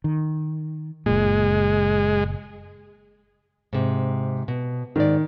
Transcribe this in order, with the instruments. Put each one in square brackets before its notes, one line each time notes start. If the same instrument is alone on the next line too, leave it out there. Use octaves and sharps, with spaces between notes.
[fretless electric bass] D#3
[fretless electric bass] F#1 A#2 [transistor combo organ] G#3
[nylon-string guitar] G#2 C3
B2
[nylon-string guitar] G#2 D5 [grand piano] D#3